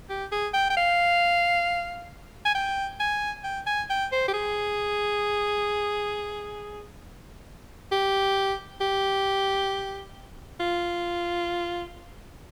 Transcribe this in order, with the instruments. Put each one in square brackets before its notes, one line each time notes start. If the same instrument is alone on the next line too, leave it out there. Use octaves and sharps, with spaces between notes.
[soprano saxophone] G4
G#4
G5
G5
F5
G#5
G5
G#5
G5
G#5
G5
C5
G4
G#4
G4
G4
F4